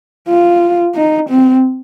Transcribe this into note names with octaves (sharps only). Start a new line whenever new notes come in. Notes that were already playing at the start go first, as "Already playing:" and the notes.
F4
D#4
C4